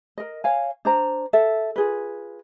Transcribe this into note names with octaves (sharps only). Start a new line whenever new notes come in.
A#4 D#5
C#5 F5 G#5
D4 C5 A#5
A4 E5
F4 G#4 B4